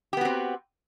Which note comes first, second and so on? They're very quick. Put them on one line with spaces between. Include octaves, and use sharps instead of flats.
G4 B3 F#4 C4